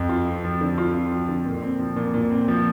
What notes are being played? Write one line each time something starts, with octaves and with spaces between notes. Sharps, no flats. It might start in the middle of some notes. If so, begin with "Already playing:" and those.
Already playing: F2
F4
C4
F3
D3
F4
C4
F3
D3
A#2
C4
F3
A#2
A#2
C4
F3